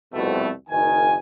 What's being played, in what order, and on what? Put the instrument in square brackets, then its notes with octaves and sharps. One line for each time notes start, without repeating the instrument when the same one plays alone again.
[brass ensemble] C2 F2 B2 A3
F#1 D#3 G#5